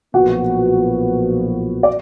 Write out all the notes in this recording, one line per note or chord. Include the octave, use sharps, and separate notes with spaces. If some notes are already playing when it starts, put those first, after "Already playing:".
B1 A#2 F3 B3 F#4 F#5
D5